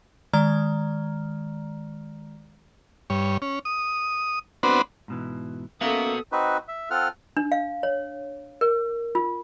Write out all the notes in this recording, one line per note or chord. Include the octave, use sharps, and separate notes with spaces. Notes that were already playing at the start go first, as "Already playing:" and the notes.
D#3 G#3 D5 A#5 F6
G2 C#5
C#4
D#6
B3 C4 D4 F#4 B4 C5
G#2 B2 E3
A#3 B3 C#4 F#4 A4 E5 F5 D#6
C4 D#4 F#4 B4
E5
C4 F4 A4 F#5 F6
D4
F5
C#5
A#4
F4